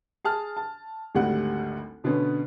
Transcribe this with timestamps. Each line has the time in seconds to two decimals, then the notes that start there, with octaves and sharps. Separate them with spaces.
0.25 G#4 A5 F6
0.57 A5
1.15 G#1 D2 G3 F#5
2.04 B2 D3 B3 C#4